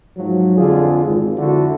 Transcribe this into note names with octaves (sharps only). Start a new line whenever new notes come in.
G#2 F3 F#3
F2 D3 F4 G#4
G#1
F2 D3 E4 F#4